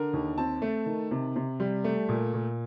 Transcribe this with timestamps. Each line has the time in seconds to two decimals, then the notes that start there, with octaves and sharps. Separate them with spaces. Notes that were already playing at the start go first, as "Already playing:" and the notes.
Already playing: D3 A#4
0.13 D#2
0.38 C4 A5
0.62 A3
0.86 D#3
1.11 C3
1.36 C3
1.60 G3
1.84 A3
2.09 A#2
2.34 A#2